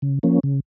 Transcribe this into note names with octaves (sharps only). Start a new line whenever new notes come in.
C#3
F3 A#3 C#4
C#3